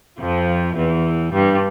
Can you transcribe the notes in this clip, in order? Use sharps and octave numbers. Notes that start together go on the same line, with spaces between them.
F2 F3
E2 E3
G2 G3